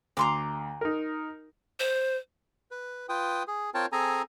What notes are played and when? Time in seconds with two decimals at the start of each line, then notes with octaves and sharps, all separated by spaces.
0.17 D2 A#5 C6 D6
0.81 D#4 A#4
1.80 C5
2.71 B4
3.09 F4 B4 G5 D#6
3.48 G#4
3.74 C4 F4 A#4 C#5 G5 A5
3.92 C4 G#4 A4 G#5 A#5